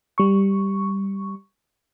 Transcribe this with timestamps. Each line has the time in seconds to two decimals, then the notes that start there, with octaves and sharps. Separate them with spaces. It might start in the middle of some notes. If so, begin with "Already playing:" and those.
0.18 G3 C#6